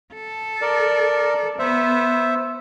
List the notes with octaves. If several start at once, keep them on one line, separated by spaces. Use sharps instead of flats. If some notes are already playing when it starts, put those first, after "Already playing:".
A4
A#4 D5
B3 C5 E5